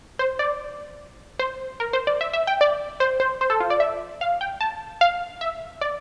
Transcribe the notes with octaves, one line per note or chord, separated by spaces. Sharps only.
C5
D5
C5
A#4
C5
D5
E5
E5
G5
D5
C5
C5
C5
A4
F4
D5
E5
F5
G5
A5
F5
E5
D5